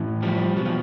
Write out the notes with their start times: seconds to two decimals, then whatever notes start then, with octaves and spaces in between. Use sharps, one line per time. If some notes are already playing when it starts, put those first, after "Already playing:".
Already playing: A2 E3
0.22 F3 G3
0.57 B2 F#3
0.65 F3